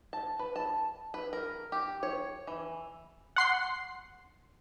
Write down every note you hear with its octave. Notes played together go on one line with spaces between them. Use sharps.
A5
B4
A5
B4
A#4
G4
C#5
E3
F#5 C6 C7